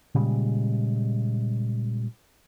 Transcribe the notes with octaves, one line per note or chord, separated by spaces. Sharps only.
A#2 C#3 G3 G#3